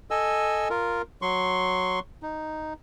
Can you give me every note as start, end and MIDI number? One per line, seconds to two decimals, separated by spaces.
0.11 0.68 69
0.11 0.68 75
0.11 0.68 80
0.11 0.68 88
0.70 1.02 65
0.70 1.02 70
1.22 1.99 54
1.22 1.99 84
1.22 1.99 85
2.23 2.73 63